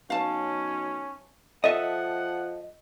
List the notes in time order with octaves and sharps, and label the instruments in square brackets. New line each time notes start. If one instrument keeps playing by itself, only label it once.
[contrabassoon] B1 [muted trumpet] C#4 [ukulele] F5 A5
[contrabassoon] F3 [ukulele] A4 [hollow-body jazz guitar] D#5 E5 [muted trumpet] F#5